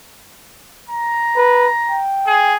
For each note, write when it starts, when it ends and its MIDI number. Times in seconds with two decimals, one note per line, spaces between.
0.89 2.01 82
1.36 1.68 71
1.89 2.53 79
2.27 2.56 68